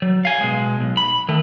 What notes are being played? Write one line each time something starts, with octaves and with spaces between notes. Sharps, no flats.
F#3
F5 G#5
B2 G#3
B1
B5
D#3 A3